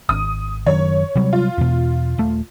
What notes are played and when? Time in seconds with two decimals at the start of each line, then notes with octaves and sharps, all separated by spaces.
0.09 G#1 D#6
0.66 F#1 F#2 D#3 C#5
1.15 C3 F#3 G3
1.33 F4
1.58 E2 B2
2.18 D#1 A3